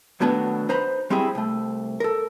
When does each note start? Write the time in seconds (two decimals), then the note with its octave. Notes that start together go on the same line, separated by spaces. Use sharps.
0.20 D#2 B2 F#3 A3 B3 D4
0.69 D#4 B4 C5 A#5 B5
1.10 G3 C4 E4 G4 G#4
1.35 C2 A3
2.00 A4 A#4